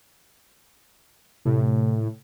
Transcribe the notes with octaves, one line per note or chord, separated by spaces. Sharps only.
A2 C3